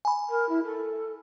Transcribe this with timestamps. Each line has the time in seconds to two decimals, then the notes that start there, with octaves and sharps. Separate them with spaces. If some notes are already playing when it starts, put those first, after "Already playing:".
0.05 G#5 B5
0.29 A#4
0.49 E4
0.64 A4